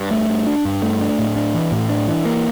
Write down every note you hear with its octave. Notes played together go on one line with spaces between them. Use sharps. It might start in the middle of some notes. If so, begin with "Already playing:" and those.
Already playing: G2
A3
G2
D4
G2
A3
D4
A2
D4
E3
A2
D4
E3
A#3